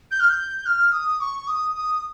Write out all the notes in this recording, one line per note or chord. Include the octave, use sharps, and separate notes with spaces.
G6
F6
G6
F6
D#6
C#6
D#6
D#6